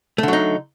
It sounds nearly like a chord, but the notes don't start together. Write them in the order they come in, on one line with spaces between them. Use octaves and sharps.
A3 D3 F#3 D#4